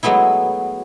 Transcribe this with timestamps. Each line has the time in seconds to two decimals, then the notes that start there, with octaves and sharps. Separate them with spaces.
0.03 F#3 G#3 A3 B3 E4